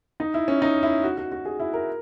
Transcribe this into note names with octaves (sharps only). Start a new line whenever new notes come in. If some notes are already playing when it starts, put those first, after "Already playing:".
D#4
E4
C#4
D#4
E4
F#4
F#4
F#4
G#4
E4
A#4